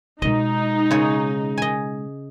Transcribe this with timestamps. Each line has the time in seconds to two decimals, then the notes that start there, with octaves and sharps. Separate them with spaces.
0.22 B2 G#3 D#4 D#5
0.91 C#3 G#4 C#5
1.58 D#5 G#5